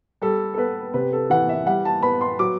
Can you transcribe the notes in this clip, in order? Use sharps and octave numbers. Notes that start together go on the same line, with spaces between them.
G3 A4
A4
B3 B4
C3 B4
A4
E3 F#5
E5
G3 F#5
A5
B3 B5
C6
F#3 D6